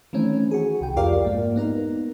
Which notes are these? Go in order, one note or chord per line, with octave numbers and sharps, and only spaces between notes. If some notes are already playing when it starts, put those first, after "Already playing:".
D#3 E3 A3 C4 C#4
F#4 G#4
C2 G5
F2 F4 G4 A#4 D5 F5
G#2 A#3
B3 D#4 A#4